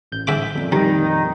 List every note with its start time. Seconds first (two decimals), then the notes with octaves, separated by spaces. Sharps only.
0.12 A1 G6
0.27 G#2 E5 D6
0.55 F2 A#2
0.72 D#3 G3 D#4